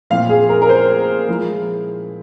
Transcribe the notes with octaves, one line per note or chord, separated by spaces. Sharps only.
A#2 F3 C4 E4 F5
G#4
A#4
A#4
C5
F3 G#3 E4